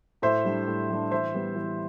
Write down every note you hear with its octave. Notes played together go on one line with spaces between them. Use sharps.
A2 C5 E5
G3 D4
A2
G3 D4
E3 C5 E5
G3 B3
E3